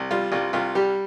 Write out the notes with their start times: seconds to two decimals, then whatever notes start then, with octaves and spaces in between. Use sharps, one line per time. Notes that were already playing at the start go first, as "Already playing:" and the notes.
Already playing: C2
0.11 G3 F4
0.32 C2 F4
0.53 C2 F4
0.75 G3 G4